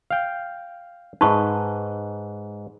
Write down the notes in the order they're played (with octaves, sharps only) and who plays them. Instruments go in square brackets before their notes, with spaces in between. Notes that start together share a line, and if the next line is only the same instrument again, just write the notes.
[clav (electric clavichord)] F5 G5
[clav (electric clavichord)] G#2 B4 [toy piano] D#4 C#6